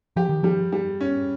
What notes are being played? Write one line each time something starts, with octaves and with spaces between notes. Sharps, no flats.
F3 G4
D#3
F3 G3
G3
C#4